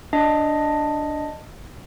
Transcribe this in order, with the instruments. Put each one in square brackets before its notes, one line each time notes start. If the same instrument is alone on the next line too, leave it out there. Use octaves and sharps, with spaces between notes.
[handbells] D4 D#5